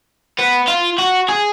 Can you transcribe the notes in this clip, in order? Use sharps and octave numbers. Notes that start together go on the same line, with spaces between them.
B3
F4
F#4
G#4